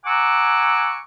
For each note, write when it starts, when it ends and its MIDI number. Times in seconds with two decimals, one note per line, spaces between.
0.05 0.98 78
0.05 0.98 80
0.05 0.98 82
0.05 0.98 85
0.05 0.98 86
0.05 0.98 88